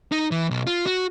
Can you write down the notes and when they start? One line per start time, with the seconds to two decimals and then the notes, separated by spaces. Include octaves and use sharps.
0.12 D#4
0.31 E3
0.50 B1
0.67 F4
0.86 F#4